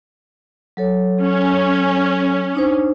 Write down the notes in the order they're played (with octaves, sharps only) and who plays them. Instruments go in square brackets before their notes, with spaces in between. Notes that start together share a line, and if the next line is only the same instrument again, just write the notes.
[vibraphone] F#3 A4 C#5
[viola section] C#4
[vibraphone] D4 D#4 C5